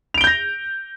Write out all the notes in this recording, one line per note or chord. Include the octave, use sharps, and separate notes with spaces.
G6 A#6 D7 F7 G7